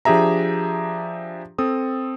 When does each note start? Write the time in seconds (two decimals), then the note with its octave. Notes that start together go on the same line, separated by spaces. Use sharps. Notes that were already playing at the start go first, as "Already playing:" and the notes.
0.05 F3 D4 G4 G#4 E5 A#5
1.58 C4 A4 D#6